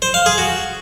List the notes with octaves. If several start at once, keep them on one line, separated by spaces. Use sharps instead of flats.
C5
F5
G#4
F#4